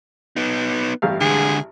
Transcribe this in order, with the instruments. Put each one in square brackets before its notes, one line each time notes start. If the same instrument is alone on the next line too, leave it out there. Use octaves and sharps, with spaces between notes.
[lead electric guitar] B3 D#4
[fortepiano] A1 G2 F5
[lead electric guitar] D3 G#3 [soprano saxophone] G#4